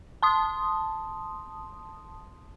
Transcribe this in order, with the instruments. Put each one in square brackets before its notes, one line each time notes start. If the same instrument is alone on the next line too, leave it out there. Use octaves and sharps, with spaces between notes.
[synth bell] A5 C6 D#6